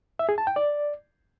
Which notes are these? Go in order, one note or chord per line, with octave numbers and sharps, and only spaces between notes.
E5
G#4
A5
G5
D5